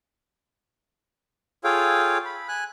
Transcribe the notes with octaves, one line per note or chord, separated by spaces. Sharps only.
F4 G#4 A4 C#5 F5 G5
B5
G#5 F#6